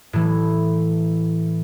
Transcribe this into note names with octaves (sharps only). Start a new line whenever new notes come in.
A2 E3